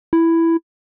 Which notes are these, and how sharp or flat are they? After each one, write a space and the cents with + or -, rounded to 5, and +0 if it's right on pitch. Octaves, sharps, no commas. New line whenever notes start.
E4 +5